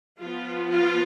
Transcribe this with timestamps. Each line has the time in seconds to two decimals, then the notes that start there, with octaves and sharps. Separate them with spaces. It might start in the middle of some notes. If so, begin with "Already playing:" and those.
0.20 F3 B3 F4
0.69 F4